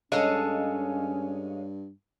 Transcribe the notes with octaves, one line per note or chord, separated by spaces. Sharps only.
G2 G#3 C#4 A4 C#5 D#5 F5